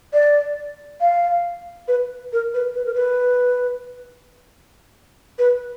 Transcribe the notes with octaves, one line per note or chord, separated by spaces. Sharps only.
D5
F5
B4
A#4
B4
B4
A#4
B4
B4